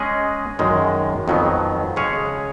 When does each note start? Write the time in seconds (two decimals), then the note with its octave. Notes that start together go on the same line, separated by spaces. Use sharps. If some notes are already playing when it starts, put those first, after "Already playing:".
Already playing: G#3 C#4 G#4 D#5
0.59 F#2 D#3 G#3
1.28 F2 D#3 F#3 B3
1.96 C#3 G#3 C#4 G#4 C#5